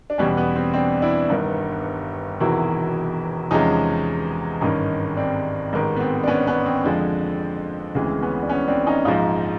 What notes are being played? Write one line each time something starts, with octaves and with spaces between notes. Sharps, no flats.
D4
E2 B2 G3 B3 C#4
B3
C4
C4 D4
D4 E4
G1 G2 D#3
E1 E2 C3 D#3 E4 F#4
E2 C3 F3 G#3 C#4 D#4
G#1 G2 D#3 C#4 D#4
C4 D4
A1 G#2 D#3
B3
C4
D4
B3 C#4
B3 C#4
C4
F2 D3 F3 G#3
D2 C#3 E3 G#3 C4
B3 C#4
D4
B3 C#4
C4 D4
C#4 D#4
A#1 G#2 F3 D#4 F4